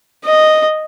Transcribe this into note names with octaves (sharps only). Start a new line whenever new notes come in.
D#5